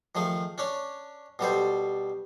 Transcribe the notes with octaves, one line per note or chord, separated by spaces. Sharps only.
D#3 F3 A3 G#4
C#4 D4 C#5
B2 G3 A4 C5